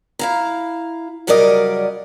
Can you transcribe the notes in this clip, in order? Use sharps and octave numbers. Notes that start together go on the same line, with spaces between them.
E4 F5 A#5
C#3 F#3 G3 A#4 D5 D#5